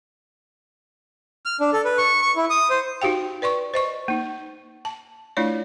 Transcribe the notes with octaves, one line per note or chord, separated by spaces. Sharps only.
F6
D4
A4
B4
C#6
C#6
E4
D#6
C5
D#4 F#4 G4 F5 G5
B4 D5 C6 C#6
C5 D#5 C#6
A#3 D#4
A5
A3 D4 E4 F4 C#5 D5